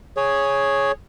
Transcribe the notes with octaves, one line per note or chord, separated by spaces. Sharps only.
G#4 C#5